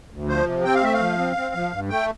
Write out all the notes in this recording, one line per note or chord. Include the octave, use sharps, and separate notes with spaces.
D2
F3 C5
C3
C4 G5
F5
A3 E5
F5
F3
C4
C4
F3
G2
A3 G5